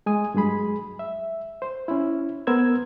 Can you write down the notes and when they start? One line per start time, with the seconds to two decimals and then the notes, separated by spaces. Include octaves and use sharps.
0.06 G#3 G#5 D#6
0.34 G2 F#3 G#3 G#4 B5
0.99 E5
1.62 C5
1.88 C#4 E4
2.47 B3 A#4 C5 E6 G#6